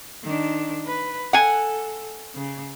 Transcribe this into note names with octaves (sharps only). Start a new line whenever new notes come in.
D#3 D4
B4
A4 F#5 G#5
C#3